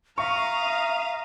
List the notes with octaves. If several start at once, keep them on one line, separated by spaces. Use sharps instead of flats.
E5 F5 A#5 C#6 D#6